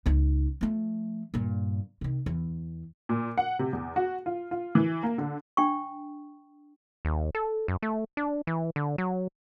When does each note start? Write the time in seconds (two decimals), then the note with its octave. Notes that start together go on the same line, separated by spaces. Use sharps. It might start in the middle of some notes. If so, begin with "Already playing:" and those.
0.06 C#2 D#4
0.61 F3 A3
1.34 G2 A#2
2.01 C3 D#3
2.26 E2
3.09 A#2
3.38 F#5
3.59 C3
3.73 E2
3.96 F#4
4.26 F4
4.51 F4
4.75 E3
5.03 A#3
5.18 D3
5.57 D4 G5 C#6
7.05 D#2
7.35 A4
7.68 F#2
7.83 A3
8.17 D4
8.47 E3
8.76 D3
8.98 F#3